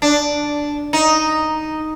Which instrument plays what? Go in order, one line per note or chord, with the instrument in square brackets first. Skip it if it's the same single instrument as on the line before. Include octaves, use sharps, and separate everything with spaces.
[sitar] D4
D#4